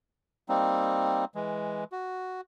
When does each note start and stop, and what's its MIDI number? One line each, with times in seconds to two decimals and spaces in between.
0.49 1.25 55
0.49 1.25 58
0.49 1.25 60
0.49 1.25 63
1.35 1.84 52
1.35 1.84 56
1.92 2.41 66